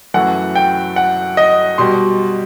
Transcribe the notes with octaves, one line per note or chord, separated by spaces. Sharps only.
F#2 E3 A3 F#5
G5
F#5
D#5
B2 G3 C6